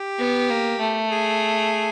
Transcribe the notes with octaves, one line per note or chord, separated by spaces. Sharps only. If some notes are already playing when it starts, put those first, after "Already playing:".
Already playing: G4
B3
A#3
A3
G#4